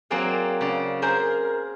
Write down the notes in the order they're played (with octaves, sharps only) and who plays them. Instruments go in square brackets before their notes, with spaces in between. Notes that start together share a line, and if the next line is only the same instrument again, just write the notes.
[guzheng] F#3 A#3 C4 G#4 D5 F5
C#3 D5
G#4 A#4 C5